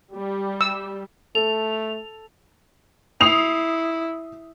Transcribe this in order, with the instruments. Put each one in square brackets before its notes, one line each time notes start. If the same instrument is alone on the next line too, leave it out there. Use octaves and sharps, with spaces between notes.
[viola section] G3 G4
[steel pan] E6
[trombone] A3 [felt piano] A4 [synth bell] F7
[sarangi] E4 [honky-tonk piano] D#6 C7 F7